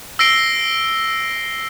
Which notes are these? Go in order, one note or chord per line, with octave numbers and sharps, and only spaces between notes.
E6 A#6 C7 D7 G7